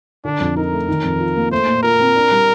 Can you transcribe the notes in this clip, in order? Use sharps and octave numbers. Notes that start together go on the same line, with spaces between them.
D3 D4
F2
D#4 A#4
A3
D#3
F2
F4
A#3
A3 C5
A#2
F4 A#4
C4
D4
G3